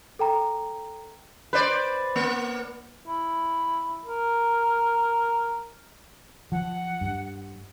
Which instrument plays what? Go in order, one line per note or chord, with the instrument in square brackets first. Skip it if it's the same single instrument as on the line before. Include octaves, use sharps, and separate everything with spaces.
[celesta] A4 G5 A#5
[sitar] B4 C5 D5
A#3
[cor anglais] E4
A#4
[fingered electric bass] F3 [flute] F#5
[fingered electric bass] G2